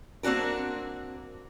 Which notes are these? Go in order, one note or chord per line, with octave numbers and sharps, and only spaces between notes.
A#3 C4 D4 F#4 A#4